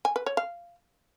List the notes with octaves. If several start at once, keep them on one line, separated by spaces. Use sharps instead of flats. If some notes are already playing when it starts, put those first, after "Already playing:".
G#5
B4
C#5
F5